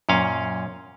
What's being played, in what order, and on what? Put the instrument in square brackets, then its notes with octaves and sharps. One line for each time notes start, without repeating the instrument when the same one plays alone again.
[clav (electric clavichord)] F#2 A#2 C#4 F5